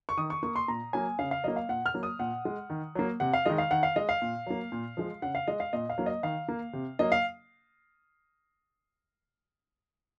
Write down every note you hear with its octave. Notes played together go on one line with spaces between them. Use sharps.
C#6
D#3 D#6
C#6
A#3 C#6
C6
A#2 A#5
F#3 A#3 G#5
C#3 F5
F5
F#3 A#3 D#5
F5
A#2 F#5
F6
F#3 A#3
D#6
A#2 F#5
G#3
D#3
F#3 A#3
C3 F#5
F5
D#3 G#3 D#5
F5
D#3 F#5
F5
G#3 D#5
F5
A#2
F#3 A#3
A#2
F3 G#3
C#3 F#5
F5
G#3 D#5
F5
A#2 D#5
F5
F#3 A#3
D#5
D#3 F5
A#3
C3
F#3 A#3 D#5
F5